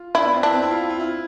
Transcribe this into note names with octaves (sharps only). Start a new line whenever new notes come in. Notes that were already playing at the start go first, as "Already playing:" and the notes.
Already playing: F4
D4 E4
B3
C4
D4 E4
C4
E4
F4
F4
E4